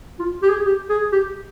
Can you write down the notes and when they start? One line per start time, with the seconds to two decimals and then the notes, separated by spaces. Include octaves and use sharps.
0.20 F4
0.42 G4
0.50 G#4
0.66 G4
0.90 G#4
1.12 G4